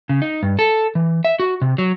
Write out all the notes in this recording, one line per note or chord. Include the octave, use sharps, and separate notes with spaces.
C#3
D#4
G2
A4
E3
E5
F#4
C3
F#3